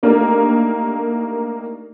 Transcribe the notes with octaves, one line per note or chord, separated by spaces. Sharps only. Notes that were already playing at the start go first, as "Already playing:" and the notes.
A3 A#3 D4 D#4 G4 A#4